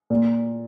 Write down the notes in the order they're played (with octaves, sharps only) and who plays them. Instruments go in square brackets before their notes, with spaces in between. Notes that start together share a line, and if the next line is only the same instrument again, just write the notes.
[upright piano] A#2